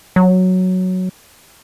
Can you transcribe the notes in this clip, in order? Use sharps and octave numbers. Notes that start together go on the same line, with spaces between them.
F#3